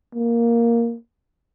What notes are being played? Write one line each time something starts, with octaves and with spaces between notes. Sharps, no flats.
A#3